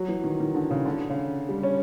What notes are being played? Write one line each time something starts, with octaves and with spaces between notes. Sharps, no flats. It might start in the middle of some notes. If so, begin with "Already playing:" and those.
Already playing: F#3
E3
D#3
D#3
D3
C#3
D3
C#3
G3
C#4